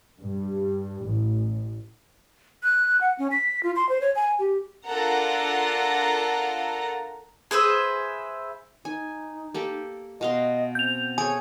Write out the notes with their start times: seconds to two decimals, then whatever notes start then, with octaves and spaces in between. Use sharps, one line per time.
0.20 G2
1.07 A1
2.63 F#6
3.01 F#5
3.19 C#4
3.31 B6
3.63 F4
3.76 C6
3.89 C5
4.01 C#5
4.16 G#5
4.39 G4
4.87 D4 F4 A4 A#4 F#5 A#5
7.51 G#4 B4 C5 E5
8.85 D#4 G#5
9.54 A#3 G4 A4
10.21 B2 D#5 F5 C6
10.75 C4 G6 F7
11.18 G#4 A4 C#5 G#5